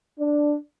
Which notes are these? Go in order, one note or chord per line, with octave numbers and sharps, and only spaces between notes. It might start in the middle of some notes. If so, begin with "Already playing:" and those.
D4